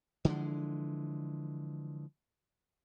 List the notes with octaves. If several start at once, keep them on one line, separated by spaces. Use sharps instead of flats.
D3 E3 F3 G#3